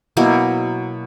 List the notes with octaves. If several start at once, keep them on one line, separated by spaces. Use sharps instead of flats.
B2 F#3 A#3 E4